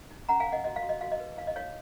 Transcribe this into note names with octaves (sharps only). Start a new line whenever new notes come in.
D#4
C#4 F#5 A#5
F5 G#5
C#4
D#5 F#5
F#4 D#5
F5
F#4
D#5
F#4 F5
D#5
B4
D#4 F5
D#5
D#4 C#5 F5